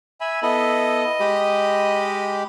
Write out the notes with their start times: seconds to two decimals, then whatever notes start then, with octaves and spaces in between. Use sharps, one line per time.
0.20 E5 G#5 B5
0.42 B3 E4 A4 D#5
1.20 G#3 G4 B5